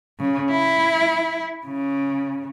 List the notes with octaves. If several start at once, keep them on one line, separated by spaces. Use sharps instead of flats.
C#3
E4
C#3